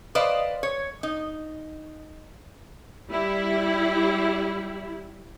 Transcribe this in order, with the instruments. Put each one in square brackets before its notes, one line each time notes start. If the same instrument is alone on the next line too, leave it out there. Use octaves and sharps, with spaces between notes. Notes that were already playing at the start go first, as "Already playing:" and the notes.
[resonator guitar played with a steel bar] B4 C5 D5 D#5 F5
C#5
D#4
[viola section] G3 E4